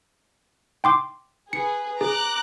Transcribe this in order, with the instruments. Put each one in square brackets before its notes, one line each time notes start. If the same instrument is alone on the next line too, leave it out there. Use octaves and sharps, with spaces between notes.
[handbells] G5 C6 D6
[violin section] G#4 B4 [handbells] C#7
[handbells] G#4 [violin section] A#5 D6 F#6